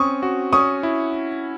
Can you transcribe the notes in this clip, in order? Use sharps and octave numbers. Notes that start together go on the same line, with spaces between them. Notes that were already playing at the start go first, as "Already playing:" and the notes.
Already playing: C4 C#4 C#6 D#6
F#4
C#4 C#6 D#6
E4